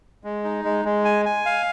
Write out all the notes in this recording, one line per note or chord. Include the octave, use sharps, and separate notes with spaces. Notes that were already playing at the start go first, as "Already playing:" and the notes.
G#3
D#4
G#3
G#3
G#5
G#5
F5